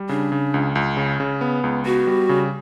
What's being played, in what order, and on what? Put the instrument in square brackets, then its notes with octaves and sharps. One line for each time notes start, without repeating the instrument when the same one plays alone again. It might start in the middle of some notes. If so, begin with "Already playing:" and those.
Already playing: [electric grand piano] G3
[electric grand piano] C#3 [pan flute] D4
[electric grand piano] C#3
C#2
C#2
C#3
C#3
B3
C#2
[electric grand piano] B3 [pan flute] F#4
[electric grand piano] G3
C#3